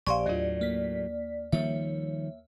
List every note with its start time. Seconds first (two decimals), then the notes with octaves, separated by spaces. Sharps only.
0.07 A#1 G4 C5 D5 F5 G#5 C6 C#6
0.26 D#2 A2 F#3 F4
0.61 A#3 B6
1.52 D#3 F3 G3 A#3 C#5 E5